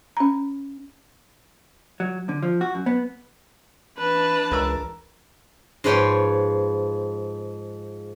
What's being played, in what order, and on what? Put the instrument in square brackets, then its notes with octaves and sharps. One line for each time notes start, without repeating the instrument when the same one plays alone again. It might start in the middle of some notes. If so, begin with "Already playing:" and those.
[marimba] C#4 A#5
[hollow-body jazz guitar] F#3
D3
F3
F#4
F#2
B3
[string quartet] E3 D4 A5 [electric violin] B4
[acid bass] C#2 [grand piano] A#4 E6
[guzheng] G#2 F3 B4 C#5 G5 C6